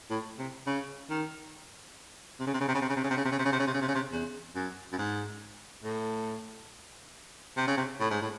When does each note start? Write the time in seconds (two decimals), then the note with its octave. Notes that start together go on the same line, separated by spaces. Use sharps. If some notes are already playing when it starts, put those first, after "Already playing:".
0.10 A2
0.39 C3
0.67 C#3
1.10 D#3
2.40 C3
2.47 C#3
2.54 C3
2.61 C#3
2.68 C3
2.75 C#3
2.82 C3
2.89 C#3
2.96 C3
3.04 C#3
3.11 C3
3.17 C#3
3.25 C3
3.31 C#3
3.39 C3
3.45 C#3
3.53 C3
3.60 C#3
3.67 C3
3.74 C#3
3.81 C3
3.88 C#3
3.95 C3
4.12 E2
4.55 F#2
4.92 F#2
4.98 G#2
5.84 A2
7.57 C3
7.67 C#3
7.77 C3
8.00 A2
8.10 G#2
8.22 A2